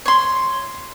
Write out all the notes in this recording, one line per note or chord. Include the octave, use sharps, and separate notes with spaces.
C#5 C6